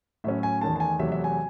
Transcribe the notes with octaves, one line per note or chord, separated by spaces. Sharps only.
A2 F#3 C#4 E5
G#5
E2 D#3 A3 A5
A5
G#5
E2 C3 F#3 A3 E5
E5
G#5